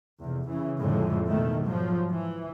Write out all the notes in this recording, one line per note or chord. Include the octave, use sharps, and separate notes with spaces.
F1 E2
C#3 E3
F2 A2 D3 G#3
B2 D#3 A3
G#2 F3 F#3
E3